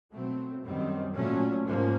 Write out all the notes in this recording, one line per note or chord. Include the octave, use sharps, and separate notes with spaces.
B2 F#3 A3 C4
F#2 D#3 G3 C4
A#2 F#3 A3 C#4
G#2 F3 A#3 C#4